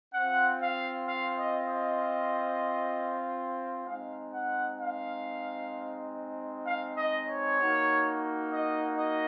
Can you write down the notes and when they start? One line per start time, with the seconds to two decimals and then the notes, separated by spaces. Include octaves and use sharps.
0.14 C4 F4 F#5
0.60 F5
1.07 F5
1.38 D#5
1.69 D#5
3.86 G#3 C4 D#4 F5
4.32 F#5
4.79 F5
6.65 F5
6.96 D#5
7.27 C#5
7.59 A#3 D#4 F#4
8.52 D#5
8.97 D#5